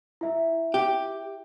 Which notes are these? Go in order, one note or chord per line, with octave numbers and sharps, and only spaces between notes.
E4 E5
G4